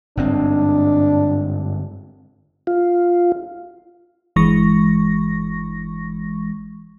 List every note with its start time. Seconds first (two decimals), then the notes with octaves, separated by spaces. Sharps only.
0.17 G1 G#2 C4 D4
2.67 F4
4.36 G1 E3 G#3 C#6 A#6